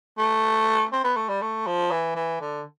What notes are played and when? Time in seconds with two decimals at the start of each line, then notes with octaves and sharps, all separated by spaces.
0.18 A3
0.92 C4
1.04 B3
1.16 A3
1.29 G3
1.42 A3
1.67 F3
1.91 E3
2.15 E3
2.41 D3